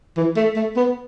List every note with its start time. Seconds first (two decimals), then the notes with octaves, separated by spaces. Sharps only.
0.17 E3
0.36 A3
0.56 A3
0.76 B3